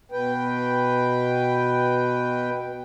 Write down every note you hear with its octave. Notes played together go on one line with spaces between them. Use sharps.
B2 B4 G5